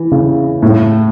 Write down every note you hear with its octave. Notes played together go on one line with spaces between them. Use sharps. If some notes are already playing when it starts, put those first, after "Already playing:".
Already playing: E3
C#3
A2